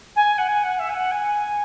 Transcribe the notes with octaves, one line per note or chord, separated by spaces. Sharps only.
G#5
F#5
G#5
F#5
E5
G#5
F#5
G#5